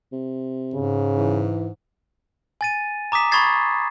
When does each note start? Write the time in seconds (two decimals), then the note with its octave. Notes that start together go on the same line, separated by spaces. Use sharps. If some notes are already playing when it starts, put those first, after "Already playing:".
0.12 C3
0.74 G#2 C#3
1.18 E3
2.61 G#5 A6 D#7
3.12 A#5 D6 D#6 B6 E7
3.32 B5 C#6 D#6 G#6 A6 C7